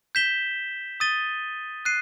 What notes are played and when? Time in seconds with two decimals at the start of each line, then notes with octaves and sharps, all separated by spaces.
0.15 G6 B6 E7 G7
1.00 D#6 A6 D#7 G7
1.85 F#6 C7 D#7